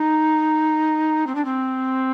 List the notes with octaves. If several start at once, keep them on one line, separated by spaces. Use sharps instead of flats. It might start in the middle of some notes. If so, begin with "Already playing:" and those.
Already playing: D#4
C4
D4
C4